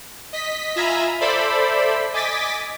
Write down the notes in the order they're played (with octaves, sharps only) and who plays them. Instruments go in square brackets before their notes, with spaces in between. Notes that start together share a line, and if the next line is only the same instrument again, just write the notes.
[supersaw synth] D#5 B6
F4 E5 G#5 A#5 B5
A4 C5 D5 E5 B5
D#5 G#5 D6 A6 B6